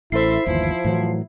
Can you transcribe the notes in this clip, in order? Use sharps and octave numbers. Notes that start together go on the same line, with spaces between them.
A1 E4 A4 C5 E5 C7
G1 D#2 E3 F3 E4
A2 E3 F#3